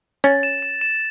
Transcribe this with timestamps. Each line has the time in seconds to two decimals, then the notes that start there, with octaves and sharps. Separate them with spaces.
0.24 C#4 A6
0.43 E7
0.62 E7
0.81 E7